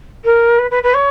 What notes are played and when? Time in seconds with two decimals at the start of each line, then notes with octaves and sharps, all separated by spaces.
0.24 A#4
0.58 B4
0.70 B4
0.83 B4
0.94 C#5